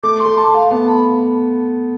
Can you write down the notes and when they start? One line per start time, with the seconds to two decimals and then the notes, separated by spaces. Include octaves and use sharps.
0.03 A3 D6
0.20 C6
0.26 A3
0.37 A5
0.48 A3
0.54 F5
0.71 B3 A5
0.88 B5